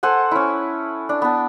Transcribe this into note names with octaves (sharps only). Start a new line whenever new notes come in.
A4 C5 F#5 G#5
C#4 E4
D4
B3 A5